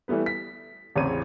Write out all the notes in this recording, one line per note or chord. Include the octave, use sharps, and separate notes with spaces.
E3 G3 A3 B3 B4
B6
A1 E2 C#3 C4 C#5 D#7